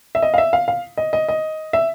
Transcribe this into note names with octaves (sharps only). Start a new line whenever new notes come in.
E5
D#5
F5
E5
F5
F5
D#5
D#5
D#5
E5